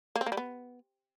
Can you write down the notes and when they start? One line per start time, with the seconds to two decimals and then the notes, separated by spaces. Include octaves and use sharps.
0.16 A#3
0.21 C4
0.26 A#3
0.32 G3
0.37 B3